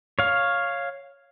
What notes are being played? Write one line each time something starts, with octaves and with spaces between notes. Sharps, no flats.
C#5 F5